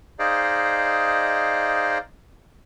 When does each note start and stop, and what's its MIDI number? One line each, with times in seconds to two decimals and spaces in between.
0.19 1.98 63
0.19 1.98 68
0.19 1.98 72
0.19 1.98 74
0.19 1.98 75
0.19 1.98 77